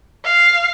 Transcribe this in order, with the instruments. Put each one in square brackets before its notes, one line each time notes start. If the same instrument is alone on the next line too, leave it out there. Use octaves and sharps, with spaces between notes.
[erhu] F5